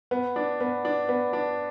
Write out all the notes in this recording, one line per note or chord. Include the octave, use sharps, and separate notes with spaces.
B3
D4
B3
D4
B3
D4